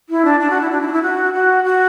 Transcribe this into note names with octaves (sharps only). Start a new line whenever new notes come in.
E4
D4
D4
F#4
E4
D4
E4
D4
E4
F#4
F#4
F#4